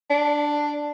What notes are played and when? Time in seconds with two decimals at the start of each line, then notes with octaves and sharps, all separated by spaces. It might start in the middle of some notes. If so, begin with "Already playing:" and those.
0.10 D4